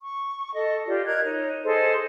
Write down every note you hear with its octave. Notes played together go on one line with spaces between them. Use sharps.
C#6
A4 D#5
F4 G4 D5
A#4 D#5 F#6 G#6
D#4 C#5
G#4 A4 C5 D#5